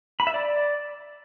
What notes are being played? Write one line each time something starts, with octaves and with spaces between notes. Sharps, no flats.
B5
E5
D5